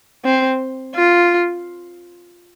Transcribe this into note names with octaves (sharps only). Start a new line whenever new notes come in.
C4
F4